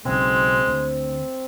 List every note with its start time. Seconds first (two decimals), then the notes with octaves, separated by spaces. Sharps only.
0.05 B1 C#3 G#3 C4
0.67 D2